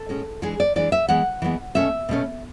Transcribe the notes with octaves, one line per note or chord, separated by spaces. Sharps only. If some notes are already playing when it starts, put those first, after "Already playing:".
Already playing: A4
A2 G#3 C#4
E3 G#3 D4 G#4
D5
E3 G#3 D4 D5
E5
E3 G#3 B3 F#5
E3 G#3 B3
B2 A3 C#4 E5
B2 A3 C#4